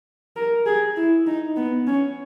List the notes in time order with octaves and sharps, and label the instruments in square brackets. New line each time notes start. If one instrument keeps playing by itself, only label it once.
[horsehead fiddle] A#4
G#4
E4
D#4
B3
C#4